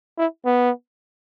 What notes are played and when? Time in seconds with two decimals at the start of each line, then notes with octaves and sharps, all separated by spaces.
0.18 E4
0.45 B3